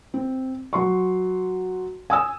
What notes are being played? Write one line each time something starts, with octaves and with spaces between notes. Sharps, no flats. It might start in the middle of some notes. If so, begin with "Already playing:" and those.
C4
F#3 C6 C#6
G#5 D#6 E6